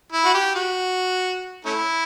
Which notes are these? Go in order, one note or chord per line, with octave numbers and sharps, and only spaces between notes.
E4
F#4
G4
F#4
A3 C#4 E4